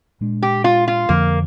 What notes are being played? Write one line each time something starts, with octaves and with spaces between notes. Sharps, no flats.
A#2 G#3 D4
G4
F4
F4
F2 D3 F3 A#3